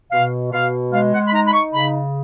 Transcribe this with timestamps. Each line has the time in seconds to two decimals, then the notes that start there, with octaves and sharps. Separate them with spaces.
0.11 B2 F5
0.52 B2 F5
0.92 G#3 F5
1.12 F#5
1.27 B5
1.32 D#4 A#5
1.46 B5
1.53 C#6
1.73 C#3 B5